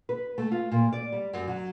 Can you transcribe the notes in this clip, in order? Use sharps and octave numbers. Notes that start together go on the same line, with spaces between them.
B4
A3
F4
A#2
D5
G3
F#2
F#3